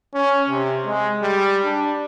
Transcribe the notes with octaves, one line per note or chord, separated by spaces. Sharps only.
C#4
C3
G#3
G3
D4